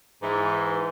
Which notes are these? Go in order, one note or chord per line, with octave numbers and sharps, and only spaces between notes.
G#2 E3